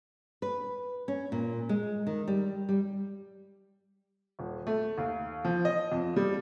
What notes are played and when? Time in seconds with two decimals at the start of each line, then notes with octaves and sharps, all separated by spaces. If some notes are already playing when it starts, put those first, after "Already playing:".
0.42 B4
1.08 C#4
1.32 A#2
1.69 G#3
2.07 D#3
2.27 G3
2.69 G3
4.39 D#1
4.67 A3
4.98 D#2
5.45 F3
5.65 D#5
5.92 F2
6.16 G3